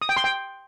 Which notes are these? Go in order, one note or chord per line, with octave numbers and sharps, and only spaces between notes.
D#6
G5
C6
G5